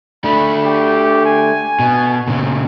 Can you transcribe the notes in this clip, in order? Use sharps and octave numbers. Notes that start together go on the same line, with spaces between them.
A3 D4 B5
G4
G#5
B2
A#2 C#3